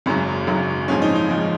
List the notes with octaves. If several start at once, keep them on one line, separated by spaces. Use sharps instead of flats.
G#1 F#2 C#3 F#3 C#4
G#1 F#2 C#3 F#3
A#1 G#2 F3 C#4
D#4
D#4
A#1 G#2 F3